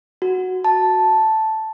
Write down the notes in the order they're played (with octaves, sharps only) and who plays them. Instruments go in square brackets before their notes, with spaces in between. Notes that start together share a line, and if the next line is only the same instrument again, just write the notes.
[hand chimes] F#4
A5